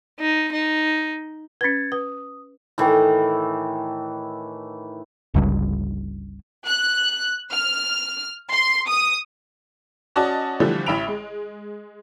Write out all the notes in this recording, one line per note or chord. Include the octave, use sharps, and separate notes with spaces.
D#4
D#4
C#4 B4 G#6 A6 C#7
B4 D#6
A2 D#3 E3
G1 C#2 G2
F#6
F6
C6
D#6
C#4 F#4 D5 D#5 A5
D3 E3 F3 G3 A3
A1 E4 E5 B5 D7 F7
G#3